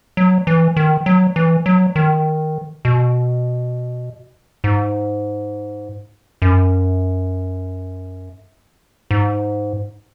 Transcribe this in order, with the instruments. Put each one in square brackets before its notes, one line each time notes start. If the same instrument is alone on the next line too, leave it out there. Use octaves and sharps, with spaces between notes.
[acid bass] F#3
E3
D#3
F#3
E3
F#3
D#3
B2
G#2
F#2
G#2